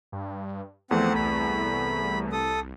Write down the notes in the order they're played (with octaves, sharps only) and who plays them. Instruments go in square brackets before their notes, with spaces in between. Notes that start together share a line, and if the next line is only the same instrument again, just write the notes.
[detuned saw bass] G2
[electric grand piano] E2 A3 [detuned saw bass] F3 [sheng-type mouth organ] C4 F#5
[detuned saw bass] C2 [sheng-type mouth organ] B5
[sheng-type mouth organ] A4 D#6